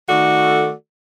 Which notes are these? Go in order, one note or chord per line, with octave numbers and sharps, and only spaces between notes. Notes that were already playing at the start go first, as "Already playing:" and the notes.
D#3 A3 F#4 A4 D5